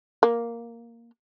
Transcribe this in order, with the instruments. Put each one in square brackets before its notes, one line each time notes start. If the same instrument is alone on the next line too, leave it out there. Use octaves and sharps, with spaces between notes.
[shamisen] A#3